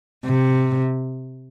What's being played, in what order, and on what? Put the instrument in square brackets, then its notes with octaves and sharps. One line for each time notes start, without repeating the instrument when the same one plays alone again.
[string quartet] C3